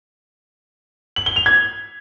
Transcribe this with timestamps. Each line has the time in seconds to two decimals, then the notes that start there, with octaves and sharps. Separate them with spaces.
1.16 F#7
1.26 G7
1.36 F7
1.46 G#6